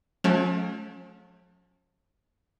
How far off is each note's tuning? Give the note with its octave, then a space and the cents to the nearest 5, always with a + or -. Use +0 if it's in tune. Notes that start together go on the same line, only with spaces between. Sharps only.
F3 +45 A3 -35 C#4 +0